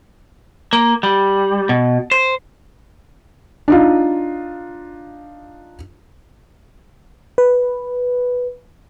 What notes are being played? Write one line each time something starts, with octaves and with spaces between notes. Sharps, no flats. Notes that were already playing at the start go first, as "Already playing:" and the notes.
A#3
G3
B2
C5
D4 D#4 F4
B4